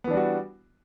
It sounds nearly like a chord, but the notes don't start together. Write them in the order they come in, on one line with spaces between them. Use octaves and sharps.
B3 E3 D4 G3 F#4